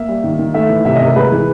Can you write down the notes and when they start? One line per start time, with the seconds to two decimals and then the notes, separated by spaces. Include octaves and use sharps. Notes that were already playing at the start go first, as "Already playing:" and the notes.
Already playing: A#3 E5
0.08 G3
0.24 D#3
0.39 D#3
0.54 A3 E5
0.70 E3
0.85 C3 E5
0.96 D#5
1.01 C3
1.06 A#4
1.16 G#3 B4
1.32 E3